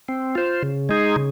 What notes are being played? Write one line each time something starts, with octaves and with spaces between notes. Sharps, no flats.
C4
F4 C5
C#3
G#3 D#4 G#4
C#3